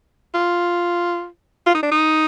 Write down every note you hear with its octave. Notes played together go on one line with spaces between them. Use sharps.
F4
F4
D#4
D4
D#4